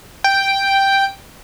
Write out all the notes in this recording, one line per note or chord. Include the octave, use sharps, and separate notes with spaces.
G5